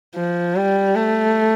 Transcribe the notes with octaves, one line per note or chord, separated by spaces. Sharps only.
F3
G3
A3